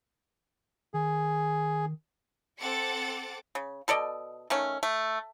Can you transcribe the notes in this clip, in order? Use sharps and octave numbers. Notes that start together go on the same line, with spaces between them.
D#3 G#4
C4 A4 F#5 D6 A6 C#7
C#3
B2 A4 D5 D#5
D#3 A3 C#4
A3